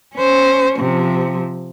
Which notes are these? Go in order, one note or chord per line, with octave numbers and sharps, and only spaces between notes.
C#4 C5
C3 F3